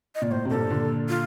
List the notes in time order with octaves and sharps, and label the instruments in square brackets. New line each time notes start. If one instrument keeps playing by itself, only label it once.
[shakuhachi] D#5
[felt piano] A#2 [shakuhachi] D5
[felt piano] A2 [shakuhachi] C5
[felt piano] C3
[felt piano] G2 A#2 [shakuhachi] A4
[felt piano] A#2 D3
[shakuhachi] F4